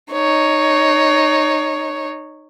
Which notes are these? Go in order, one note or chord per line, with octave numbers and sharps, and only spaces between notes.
D#4 C#5